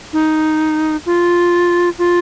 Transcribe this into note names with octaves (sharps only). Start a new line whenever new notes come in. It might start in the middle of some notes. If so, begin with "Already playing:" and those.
D#4
F4
F4